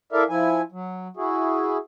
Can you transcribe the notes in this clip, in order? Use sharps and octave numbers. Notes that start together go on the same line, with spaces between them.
E4 A4 A#4 D5 E5 F5
F3 E4 G#5
F#3
E4 F#4 G#4